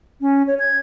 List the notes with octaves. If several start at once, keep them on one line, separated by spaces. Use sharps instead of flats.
C#4
C#5
G#6